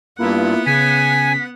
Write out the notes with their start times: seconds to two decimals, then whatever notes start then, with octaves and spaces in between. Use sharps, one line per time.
0.18 G2 A#3 B3 E4 F4 F#5
0.66 C#3 G#5 B6